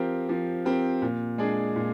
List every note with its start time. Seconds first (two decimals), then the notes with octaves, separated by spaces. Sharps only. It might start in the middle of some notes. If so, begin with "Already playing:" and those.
Already playing: F3 C4 G4 A#4
0.29 F3
0.65 C4 G4 A#4
1.02 A#2
1.38 G#3 D4 G#4
1.76 A#2